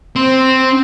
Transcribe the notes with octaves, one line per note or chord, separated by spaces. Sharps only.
C4